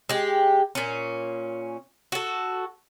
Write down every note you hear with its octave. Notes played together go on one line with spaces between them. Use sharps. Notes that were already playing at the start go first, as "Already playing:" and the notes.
G#3 G4
A#2 C#4
F#4 A4